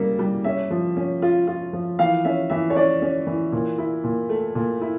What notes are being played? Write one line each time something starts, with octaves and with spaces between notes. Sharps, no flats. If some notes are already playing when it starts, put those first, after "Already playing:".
Already playing: C#3 G3 A#3 E4
G3
C#4 E5
F3
C#4
F4
F4
F3
E3 F5
C#4 E5
E3 E5
C#5
C#4 D5
C#4
E3
A#2
E4
A#2
A3
A#2
E4